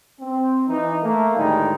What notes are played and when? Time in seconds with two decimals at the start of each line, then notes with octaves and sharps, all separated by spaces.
0.20 C4
0.67 E3 D#4
1.03 A3 A#3
1.36 D2 A2 D#3 G3 G#3 D#4